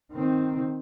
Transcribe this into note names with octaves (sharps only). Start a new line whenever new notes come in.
D#3 C4